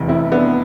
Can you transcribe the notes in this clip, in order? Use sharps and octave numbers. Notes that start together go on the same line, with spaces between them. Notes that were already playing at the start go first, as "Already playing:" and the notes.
Already playing: F1 E2 C3 E3
C4 E4
B3 D4